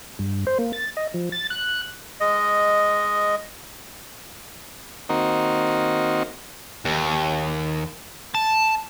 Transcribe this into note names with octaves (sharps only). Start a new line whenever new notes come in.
G2
C5
A#3
A6
D#5
F3
A6
F#6
G#3 D#5
D#3 A#3 C4 D#4 F#4
D#2
A5